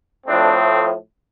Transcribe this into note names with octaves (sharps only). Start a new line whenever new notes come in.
A2 F3 A3 C4 D4